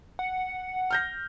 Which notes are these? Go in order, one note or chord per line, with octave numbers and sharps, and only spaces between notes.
F#5
F6 G6 A#6